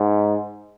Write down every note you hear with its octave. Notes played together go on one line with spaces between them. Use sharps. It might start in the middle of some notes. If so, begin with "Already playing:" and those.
Already playing: G#2